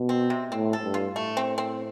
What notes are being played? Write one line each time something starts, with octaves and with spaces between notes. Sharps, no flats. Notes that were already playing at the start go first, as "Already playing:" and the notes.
Already playing: B2
C4
C3
A2 C4
A4
G2
F4
A2 A3
C4
C4